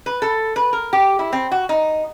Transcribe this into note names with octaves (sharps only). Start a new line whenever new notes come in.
B4
A4
B4
A#4
G4
E4
C4
F#4
D#4